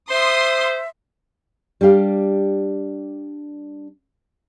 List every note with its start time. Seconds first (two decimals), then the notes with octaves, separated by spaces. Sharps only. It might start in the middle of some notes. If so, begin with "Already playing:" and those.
0.10 C5 E5 C6 D#6
1.81 G3 D4 G4 F5